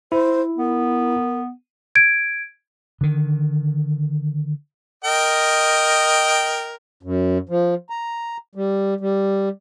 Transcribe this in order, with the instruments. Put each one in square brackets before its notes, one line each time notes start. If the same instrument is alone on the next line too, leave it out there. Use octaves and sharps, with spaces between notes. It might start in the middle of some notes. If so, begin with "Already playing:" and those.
[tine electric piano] E4 [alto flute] C5
[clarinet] B3 [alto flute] A#4
[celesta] G#6 D7
[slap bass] D3 D#3
[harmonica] A#4 D#5 G5
[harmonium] F#2
F3
A#5
G3
G3